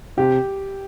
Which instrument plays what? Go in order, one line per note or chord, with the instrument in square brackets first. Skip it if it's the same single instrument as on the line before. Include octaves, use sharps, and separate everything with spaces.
[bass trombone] C3 [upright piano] G4